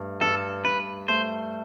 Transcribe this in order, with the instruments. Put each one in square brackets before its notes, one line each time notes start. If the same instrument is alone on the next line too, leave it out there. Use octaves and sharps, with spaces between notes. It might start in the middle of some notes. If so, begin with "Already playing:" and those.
Already playing: [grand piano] G2 A3
[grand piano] G2 [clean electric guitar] A4
[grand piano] G2 [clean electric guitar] B4
[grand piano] A3 [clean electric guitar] C5